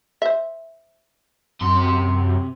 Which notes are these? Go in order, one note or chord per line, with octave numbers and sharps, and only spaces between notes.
C5 E5
F#2 C3 C6